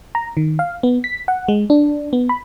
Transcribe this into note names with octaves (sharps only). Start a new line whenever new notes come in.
A#5
D#3
F5
B3
B6
F#5
G#3
D4
B3
B5